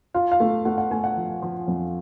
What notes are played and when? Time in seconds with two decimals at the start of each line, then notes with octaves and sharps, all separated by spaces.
0.14 F4 F5
0.32 F5
0.40 A3
0.65 A3 F#5
0.78 F#5
0.91 A3 G#5
1.04 F#5
1.17 F3
1.42 F3
1.68 F2